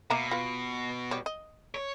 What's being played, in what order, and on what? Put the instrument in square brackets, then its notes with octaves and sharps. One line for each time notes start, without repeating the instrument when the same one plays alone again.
[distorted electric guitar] B2 [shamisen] A#3 E5 A#5
[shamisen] F4 B4
G3 C#5
D#5
[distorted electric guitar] C#5